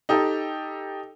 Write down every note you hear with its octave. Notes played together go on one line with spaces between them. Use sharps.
D#4 G4 A4